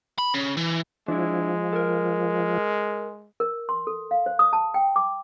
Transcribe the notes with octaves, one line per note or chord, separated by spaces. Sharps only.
B5
C#3
E3
F3 G#3 D4 E4
A4 A#4
A#4
C6
A4
F5
C5
D#6
A5
G5
D6